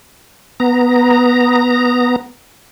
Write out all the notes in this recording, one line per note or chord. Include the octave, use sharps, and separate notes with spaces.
B3 A#5